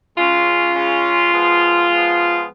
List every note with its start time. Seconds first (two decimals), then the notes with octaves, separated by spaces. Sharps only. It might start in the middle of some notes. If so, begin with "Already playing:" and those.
0.17 C#3 G#3 C#4 F4
0.75 C#3 G#3 C#4
1.32 F3 G#3 B3
1.90 F3 G#3 B3